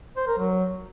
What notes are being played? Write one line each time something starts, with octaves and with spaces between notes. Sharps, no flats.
C5
A#4
F#3